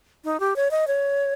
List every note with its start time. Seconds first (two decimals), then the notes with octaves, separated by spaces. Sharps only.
0.24 D#4
0.40 G4
0.56 C#5
0.71 D#5
0.87 C#5